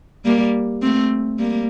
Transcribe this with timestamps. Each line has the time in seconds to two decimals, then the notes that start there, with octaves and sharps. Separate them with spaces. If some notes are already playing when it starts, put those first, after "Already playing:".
0.25 G3 A#3
0.82 A3 C4
1.39 G3 A#3